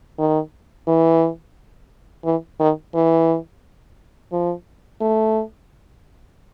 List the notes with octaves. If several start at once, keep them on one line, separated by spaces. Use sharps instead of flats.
D#3
E3
E3
D#3
E3
F3
A3